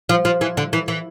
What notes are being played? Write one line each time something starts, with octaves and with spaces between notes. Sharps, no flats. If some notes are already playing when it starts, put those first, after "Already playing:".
F3
F3
E3
D3
E3
E3